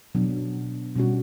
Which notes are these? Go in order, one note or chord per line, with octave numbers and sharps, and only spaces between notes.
B2 F#3 B3 D4
B2 G3 C#4 F#4